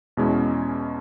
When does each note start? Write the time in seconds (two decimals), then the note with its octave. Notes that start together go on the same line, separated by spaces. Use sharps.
0.17 E2 B2 G#3 C#4 E4